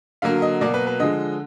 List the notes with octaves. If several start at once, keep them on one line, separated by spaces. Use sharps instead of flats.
D3 F#3 A#3 F5
D#5
B2 F#3 A#3 D5
B4
B4
D3 F3 G#3 D#5